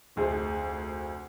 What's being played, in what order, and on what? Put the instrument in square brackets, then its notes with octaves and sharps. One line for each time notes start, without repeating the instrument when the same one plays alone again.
[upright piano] F1 D2 G#4 C5